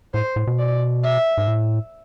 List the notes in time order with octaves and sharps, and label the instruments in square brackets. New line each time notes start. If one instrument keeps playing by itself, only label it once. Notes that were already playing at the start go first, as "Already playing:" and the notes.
[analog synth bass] A2 [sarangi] C5
[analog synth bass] A2
B2
[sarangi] D5
E5
[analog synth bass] G#2
A2